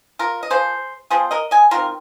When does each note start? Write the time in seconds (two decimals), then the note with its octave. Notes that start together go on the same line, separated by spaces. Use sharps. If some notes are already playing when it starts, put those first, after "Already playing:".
0.19 F4 A#4
0.43 D#5
0.50 F3 A#3 G#4 C5
1.10 F3 G#3 C4 G#4 C5
1.31 A#4 D#5
1.51 D#5 G#5
1.71 D#3 C4 F4 A#4